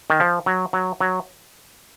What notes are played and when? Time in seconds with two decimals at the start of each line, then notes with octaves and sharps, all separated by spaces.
0.10 D#3
0.20 F3
0.46 F#3
0.73 F#3
1.00 F#3